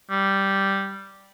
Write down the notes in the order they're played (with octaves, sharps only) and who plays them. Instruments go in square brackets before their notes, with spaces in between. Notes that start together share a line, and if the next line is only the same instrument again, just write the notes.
[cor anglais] G3